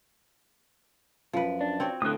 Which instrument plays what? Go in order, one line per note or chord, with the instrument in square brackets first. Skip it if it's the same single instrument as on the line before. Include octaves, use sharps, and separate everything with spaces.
[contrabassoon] F#2 [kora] F3 B4
[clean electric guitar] D4
[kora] C4 F#4 C#5
[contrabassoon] D2 [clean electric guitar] A2 D3 [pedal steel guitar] D#6 F#6